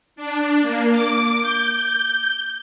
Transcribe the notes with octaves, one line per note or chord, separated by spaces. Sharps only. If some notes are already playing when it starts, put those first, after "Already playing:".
D4
A#3
D6
G6